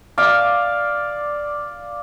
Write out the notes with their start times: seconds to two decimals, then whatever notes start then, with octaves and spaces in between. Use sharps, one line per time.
0.18 D5 F5